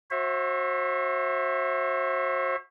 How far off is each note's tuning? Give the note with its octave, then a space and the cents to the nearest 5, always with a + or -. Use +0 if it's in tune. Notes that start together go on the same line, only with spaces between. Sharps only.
F#4 -15 C5 +40 E5 +0